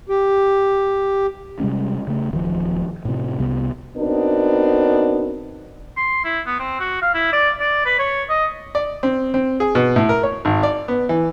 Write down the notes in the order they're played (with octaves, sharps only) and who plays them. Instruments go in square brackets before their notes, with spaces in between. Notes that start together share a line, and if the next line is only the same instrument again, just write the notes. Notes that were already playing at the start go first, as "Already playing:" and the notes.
[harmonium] G4
[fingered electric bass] C3 G3 G#3 C#4
C#3 A3
D1 D#3 F3
A2 C3
C2 C3 B3
[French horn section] B3 C4 D4 D#4 F#4 A#4
[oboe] C6
E4
B3
C4
F#4
F5
E4
D5
D5
B4
C#5
D#5
[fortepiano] D5
C4
C4
G#4
B2
A2
A#4
C#5
G#1
D5
B3
E3